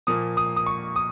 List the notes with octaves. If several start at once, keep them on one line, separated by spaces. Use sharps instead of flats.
A#2 F3 A#3 D#6
D#6
D#6
C#6
D#6